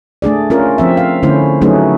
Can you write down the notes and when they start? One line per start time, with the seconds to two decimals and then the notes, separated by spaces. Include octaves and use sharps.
0.22 A3 D4 G#4 D5
0.50 C#4 F4 A#4
0.78 F3 C4 E5
0.97 F5
1.23 D3 A3 C#4 E4 C5
1.61 F#3 A3 C#4 D#4 G#4 B4